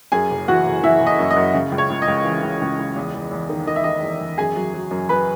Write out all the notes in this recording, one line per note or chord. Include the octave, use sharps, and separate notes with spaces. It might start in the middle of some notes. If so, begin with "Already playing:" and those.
F#2 G#4 G#5
F#1
E3 F#4 F#5
F#1
E3 E4 E5
F#1
D#5
F#2
D#5
F#2
C#3
C#2
C#5
C#2
D#5
C#2
E3
C#2
C#2
C#2
E2
E2
E2
D#3
D#3 D#5
E5
D#3 D#5
E2
E2
F#2 G#4 G#5
F#3
F#3
F#2
F#3 B4 B5